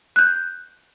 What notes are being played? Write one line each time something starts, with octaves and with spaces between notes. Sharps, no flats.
F#6 G6